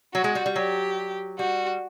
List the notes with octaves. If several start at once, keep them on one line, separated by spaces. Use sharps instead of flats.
F#3 F#4
G#3
G3
G3
F#3 G4
G3 F#4